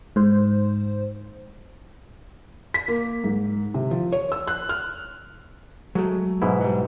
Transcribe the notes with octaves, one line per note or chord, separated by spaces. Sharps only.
G#2 C5
B6
A#3
G#2
C3
F3
C#5
E6
F#6
F6
F#3 G#3 A3
G#2 B2 E4
F#3 G3